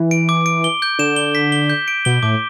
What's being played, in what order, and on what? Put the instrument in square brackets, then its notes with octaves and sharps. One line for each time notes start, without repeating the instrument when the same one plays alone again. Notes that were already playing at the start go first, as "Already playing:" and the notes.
Already playing: [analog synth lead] E3
[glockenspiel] D7
D6
D7
G7
G6
[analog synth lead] D3 [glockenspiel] E7
[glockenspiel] G7
B6
G7
G6
D7
[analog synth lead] B2 [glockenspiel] G7
[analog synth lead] A2 [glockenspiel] D6